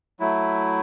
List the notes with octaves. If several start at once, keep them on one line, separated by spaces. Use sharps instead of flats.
F#3 A3 E4